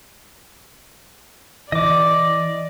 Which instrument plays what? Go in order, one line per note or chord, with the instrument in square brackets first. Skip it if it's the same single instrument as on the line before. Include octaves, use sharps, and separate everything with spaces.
[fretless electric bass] E3 [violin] D5 [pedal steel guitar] D#5 D6